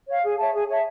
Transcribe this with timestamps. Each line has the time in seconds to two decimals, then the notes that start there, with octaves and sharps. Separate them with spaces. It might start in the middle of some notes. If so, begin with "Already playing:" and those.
0.08 C#5 F5
0.23 G#4
0.38 C#5 E5 A5
0.53 G#4
0.68 C#5 E5 A5